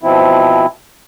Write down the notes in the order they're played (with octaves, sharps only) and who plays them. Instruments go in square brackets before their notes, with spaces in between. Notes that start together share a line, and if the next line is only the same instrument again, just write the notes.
[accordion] B2 F3 C4 E4